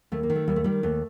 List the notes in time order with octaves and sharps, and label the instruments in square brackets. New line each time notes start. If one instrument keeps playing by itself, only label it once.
[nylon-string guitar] D#2 A3
A#3
D#3
A3
D#2 G3
A3
D#3 G3
D#2 A3